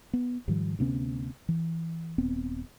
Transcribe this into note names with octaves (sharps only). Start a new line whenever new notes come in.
B3
G#2 D#3 F3 G3
D2 C3 B3 C#4
E3
D#1 B3 C4